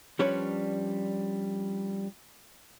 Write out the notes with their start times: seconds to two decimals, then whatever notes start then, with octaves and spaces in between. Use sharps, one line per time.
0.19 F3 G3 C#4 D4 B4 C#5